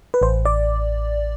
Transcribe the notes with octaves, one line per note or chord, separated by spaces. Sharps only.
B4
A1 C5
D5